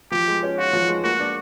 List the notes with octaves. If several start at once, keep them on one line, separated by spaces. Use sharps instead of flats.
F3 G4
G#3
C#4
F4 F#4
F3
G#3
A#3 F#4
D4